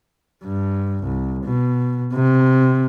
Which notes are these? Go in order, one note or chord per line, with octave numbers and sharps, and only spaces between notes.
G2
C2
B2
C3